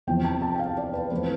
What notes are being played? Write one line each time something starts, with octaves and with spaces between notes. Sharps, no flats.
E2 C3 F3 G5
A5
A5
G5
F5
D5
B4
F2 E3 A3 C4 B4